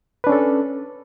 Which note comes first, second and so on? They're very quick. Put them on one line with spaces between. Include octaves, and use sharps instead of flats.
B4 D4 C#4 A4